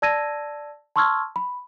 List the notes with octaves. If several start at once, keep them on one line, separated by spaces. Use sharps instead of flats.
D5 A5 E6 G#6 A#6 D#7
A5 C6 C#6 E6 F6 G#6
B5